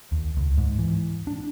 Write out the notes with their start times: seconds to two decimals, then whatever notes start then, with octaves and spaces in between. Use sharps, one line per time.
0.12 D#2
0.37 C#2
0.57 G#2
0.79 E3
1.27 D4